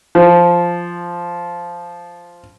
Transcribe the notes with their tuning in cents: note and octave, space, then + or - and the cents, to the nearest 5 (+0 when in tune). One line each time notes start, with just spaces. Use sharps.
F3 -5